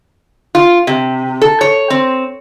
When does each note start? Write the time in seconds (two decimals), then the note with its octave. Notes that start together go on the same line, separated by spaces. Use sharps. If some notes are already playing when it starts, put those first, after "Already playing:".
0.55 F4
0.87 C3
1.42 A4
1.61 C#5
1.90 C4